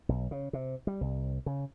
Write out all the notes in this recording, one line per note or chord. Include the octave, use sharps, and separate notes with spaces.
B1
C#3
C3
G3
C2
C#3